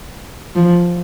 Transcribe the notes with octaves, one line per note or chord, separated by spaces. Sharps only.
F3